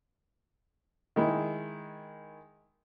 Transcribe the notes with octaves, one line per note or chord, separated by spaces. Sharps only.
D#3 G#3 E4